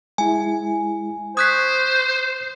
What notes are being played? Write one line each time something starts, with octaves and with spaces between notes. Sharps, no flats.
G#3 E4 G#5
C5 C#6 D#6 F#6 G#6 B6